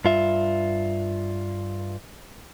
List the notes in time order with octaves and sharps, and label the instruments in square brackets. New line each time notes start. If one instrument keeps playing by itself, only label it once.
[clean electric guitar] G2 F4 E5